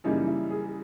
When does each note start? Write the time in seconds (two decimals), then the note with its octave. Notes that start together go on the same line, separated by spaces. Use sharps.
0.04 F#2 C#3 E3 G3 A#3 D#4
0.27 E4
0.50 G#4